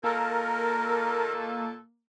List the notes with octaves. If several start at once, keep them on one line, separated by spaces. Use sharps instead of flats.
A#2 D#3 A#3 A4 A#4